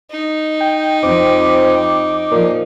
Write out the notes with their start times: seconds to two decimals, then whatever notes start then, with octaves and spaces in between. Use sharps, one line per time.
0.11 D#4
0.60 G5
1.03 F2 C4 D6
2.32 A#2 F3